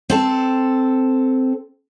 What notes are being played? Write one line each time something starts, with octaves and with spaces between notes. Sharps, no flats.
C4 A4 C5